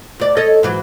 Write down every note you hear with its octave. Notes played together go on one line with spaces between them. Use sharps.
D2 D5
A4 C#5 D#5
G#2 E3 F#3